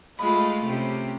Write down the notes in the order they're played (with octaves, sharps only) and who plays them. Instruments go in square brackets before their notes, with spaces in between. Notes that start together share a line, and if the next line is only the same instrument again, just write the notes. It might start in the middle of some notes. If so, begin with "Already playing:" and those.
[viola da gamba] G#3 A3 [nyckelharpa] F4 [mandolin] B5
[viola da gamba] C3 [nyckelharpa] C#4 G4